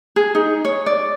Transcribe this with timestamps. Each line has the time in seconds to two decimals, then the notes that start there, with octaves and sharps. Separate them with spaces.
0.16 G#4
0.35 D#4
0.65 C#5
0.86 D5